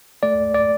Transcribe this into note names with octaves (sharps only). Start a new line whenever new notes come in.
A3 D5
D5